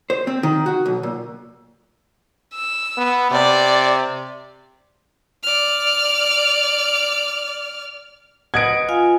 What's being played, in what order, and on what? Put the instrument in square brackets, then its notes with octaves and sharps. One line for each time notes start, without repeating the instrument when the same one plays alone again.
[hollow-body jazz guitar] C5
C4
D#3
F#4
B1
A#2
[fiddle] E6
[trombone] B3
[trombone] C3 [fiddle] D5
[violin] D5 F6
[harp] B4 D#5 F#5 [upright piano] G#6 D7
[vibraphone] F4 F5 G#5